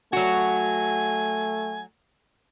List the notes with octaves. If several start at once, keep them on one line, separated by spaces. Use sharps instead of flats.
F#3 A3 F#4 G#5